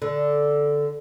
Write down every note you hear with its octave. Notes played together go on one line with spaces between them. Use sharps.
D3